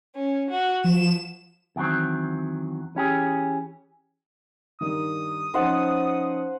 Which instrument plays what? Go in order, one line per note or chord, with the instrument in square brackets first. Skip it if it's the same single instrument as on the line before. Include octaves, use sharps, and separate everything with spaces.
[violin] C#4
F#4
[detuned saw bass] F3 [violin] E7
[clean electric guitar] E2 D#3 F#3 C4
E3 C#4 G4 G#4
[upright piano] G2 D#3 [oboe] D#6
[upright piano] F3 C#4 D#4 [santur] C5 F#5 A5